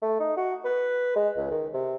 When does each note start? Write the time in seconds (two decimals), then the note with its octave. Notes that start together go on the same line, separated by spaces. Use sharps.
0.02 A3
0.20 D#4
0.37 F#4
0.65 B4
1.16 G#3
1.37 C#2
1.51 D#3
1.74 C3